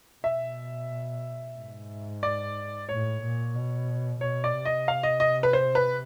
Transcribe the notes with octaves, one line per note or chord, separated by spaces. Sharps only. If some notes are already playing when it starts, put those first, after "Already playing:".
B2 E5
G#2
D5
A2 C#5
A#2
B2
B2 C#5
D5
C3
D#5
F5
D#5
D#5
B4
C5
B4